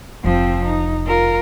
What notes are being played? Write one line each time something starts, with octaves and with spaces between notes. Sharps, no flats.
F1 F2 F3 C4
D#4
F4 A#4